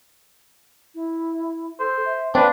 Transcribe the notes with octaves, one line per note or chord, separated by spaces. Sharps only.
E4
A4 C5
E5
C4 D4 B4 F5